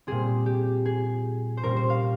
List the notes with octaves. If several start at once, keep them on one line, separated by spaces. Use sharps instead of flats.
A#2 G3 C4 G#4
G4
G#4
C5
A#2 G3 C#4 A#4
C5
F5